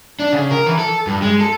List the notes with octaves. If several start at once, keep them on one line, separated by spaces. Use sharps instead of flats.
D4
C#3
A#4
E3
A4
G2
G#3
A4